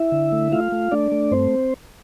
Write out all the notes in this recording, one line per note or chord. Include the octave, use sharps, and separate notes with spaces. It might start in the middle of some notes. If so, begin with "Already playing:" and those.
Already playing: E4 E5
D3
A3
A3 F4 F5
A3
A3 D4 D5
A3
G2 C4 C5